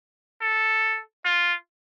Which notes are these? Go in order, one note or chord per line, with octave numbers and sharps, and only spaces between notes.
A4
F4